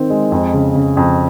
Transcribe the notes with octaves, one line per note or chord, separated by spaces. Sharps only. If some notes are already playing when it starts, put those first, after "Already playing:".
Already playing: D#3 C4
G#3
F2
C#3
C#3
F2